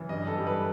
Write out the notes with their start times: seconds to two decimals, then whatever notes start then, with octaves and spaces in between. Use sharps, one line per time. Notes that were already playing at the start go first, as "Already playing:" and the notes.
Already playing: F#1 E3
0.09 G2 D#5
0.27 A4
0.37 G3
0.47 B4